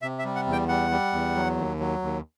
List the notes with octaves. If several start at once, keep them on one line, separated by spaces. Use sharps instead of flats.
C3 E5
E5
G3
F#5
E2
G5
G3 F#5
G3
E2
F#3
D#2
F#3
D#2